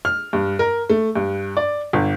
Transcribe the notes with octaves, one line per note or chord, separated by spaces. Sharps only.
F6
G2
A#4
A3
G2
D5
G1